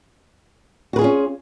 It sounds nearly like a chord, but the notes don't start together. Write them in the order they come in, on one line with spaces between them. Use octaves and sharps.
F#4 B4 G#4 F4 C#4